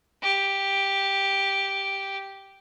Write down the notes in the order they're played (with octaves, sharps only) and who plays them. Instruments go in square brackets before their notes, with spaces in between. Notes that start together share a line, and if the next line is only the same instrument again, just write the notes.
[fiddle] G4